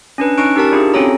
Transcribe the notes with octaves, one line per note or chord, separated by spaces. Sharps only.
C#4 D4 B4
C#4 D#4 C#6 F#6 D7
D#4 G4 A#4 A5
D4 E4 F4 G4 G#4
C4 C#4 F#4 A4 C#5 A#5